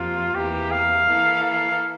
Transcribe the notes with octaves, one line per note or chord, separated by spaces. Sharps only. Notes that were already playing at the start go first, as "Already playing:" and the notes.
Already playing: F2 C3 F3 A#3 F4
E2 C3 E3 A#3 G4
F5
E3 A#3 E4 A4
F5